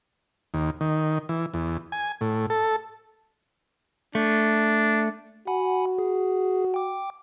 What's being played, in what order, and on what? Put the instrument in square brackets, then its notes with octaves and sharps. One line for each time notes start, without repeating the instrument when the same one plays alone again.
[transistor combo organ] D#2
D#3
E3
E2
G#5
A2
A4
[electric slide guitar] A3 [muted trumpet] D4
[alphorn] F#4 [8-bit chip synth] F#5 G#5 B5
[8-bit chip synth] G#4
G5 D6